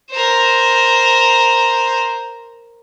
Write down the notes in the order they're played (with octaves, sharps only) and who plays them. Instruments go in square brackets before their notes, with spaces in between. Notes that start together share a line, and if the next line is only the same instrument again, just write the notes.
[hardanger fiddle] A#4 C5